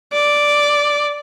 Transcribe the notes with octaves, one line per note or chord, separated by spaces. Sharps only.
D5